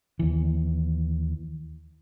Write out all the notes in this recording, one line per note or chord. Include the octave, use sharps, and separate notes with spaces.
D#2 E3